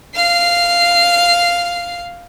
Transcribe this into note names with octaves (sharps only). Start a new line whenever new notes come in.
F5 C7